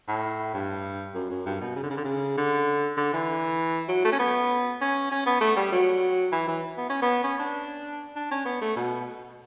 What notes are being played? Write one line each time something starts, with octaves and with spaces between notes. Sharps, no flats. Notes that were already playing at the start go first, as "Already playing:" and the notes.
A2
G2
F#2
F#2
G2
B2
C#3
D3
C#3
D3
C#3
D3
D3
E3
F#3
A3
C#4
B3
C#4
C#4
B3
A3
G3
F#3
E3
E3
B3
C#4
B3
C#4
D4
D4
C#4
B3
A3
B2